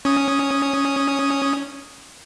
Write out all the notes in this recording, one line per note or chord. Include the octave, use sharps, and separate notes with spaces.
C#4 D#6